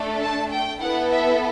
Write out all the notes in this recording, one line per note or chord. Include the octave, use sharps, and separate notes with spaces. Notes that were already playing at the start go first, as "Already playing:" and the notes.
Already playing: A3 D4 A4
A5
G5
B3 E4 A4 F#5
E5